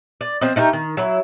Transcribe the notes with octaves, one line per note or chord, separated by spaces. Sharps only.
D5
F3 C4 D#5
A3 D#4 G4 A#4
D#3
F#3 E4